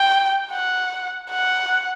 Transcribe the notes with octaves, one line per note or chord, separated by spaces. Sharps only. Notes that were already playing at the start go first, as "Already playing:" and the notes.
Already playing: G5
F#5
F#5